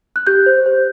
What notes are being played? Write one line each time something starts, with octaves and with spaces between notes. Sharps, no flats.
F#6
G4 G6
C5
C5